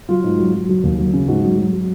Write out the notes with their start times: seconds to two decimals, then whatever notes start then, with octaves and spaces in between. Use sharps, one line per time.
0.09 F#3 F4
0.24 G#2
0.39 F#3
0.54 F#3
0.69 F#3
0.83 D#2
0.98 F#3
1.13 C#3
1.28 G#2 F#4
1.43 F#3
1.58 F#3
1.73 F#3